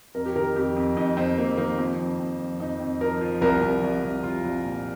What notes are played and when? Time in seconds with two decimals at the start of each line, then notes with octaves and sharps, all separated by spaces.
0.15 F2 A#4
0.26 G4
0.36 D#3 A#4
0.56 F2 G4
0.76 F2
0.96 F2 D#4
1.17 F2 C4
1.37 F2 A#3
1.57 D#3 A#3
1.78 F3 C4
1.99 F2
2.19 F2
2.40 F2
2.60 F2 D#4
2.80 F2
3.01 F3 A#4
3.21 F3
3.41 C2 A#4
3.62 C2
3.82 C2
4.03 C2
4.23 C2 F4
4.44 C2
4.64 A#2